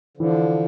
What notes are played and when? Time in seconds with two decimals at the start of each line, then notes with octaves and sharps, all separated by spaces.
0.17 D3 E3 F3